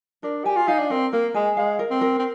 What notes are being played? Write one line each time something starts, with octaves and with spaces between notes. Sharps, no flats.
D4 A#4
G4 G#5
F4
D#4 F5
D4
C4 A#4
A#3 A#4
G#3 G#5
G#3 F5
A#4
C4
A#4
C4